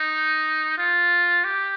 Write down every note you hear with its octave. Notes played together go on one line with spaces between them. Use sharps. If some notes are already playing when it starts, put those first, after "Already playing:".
Already playing: D#4
F4
G4